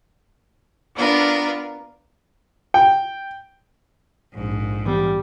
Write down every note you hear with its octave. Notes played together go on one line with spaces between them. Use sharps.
B3 D4 F4 A#4 B4
G5
A#1 F2 G#2
E3 G3 B3